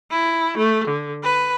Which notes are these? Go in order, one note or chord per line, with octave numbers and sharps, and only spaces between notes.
E4
A3
D3
B4